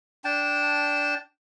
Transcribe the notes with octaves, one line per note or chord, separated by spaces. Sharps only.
D4 G5 A5